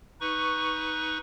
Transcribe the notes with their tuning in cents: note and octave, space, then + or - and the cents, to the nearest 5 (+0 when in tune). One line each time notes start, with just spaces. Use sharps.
D#4 +20 B4 +0 C#6 +0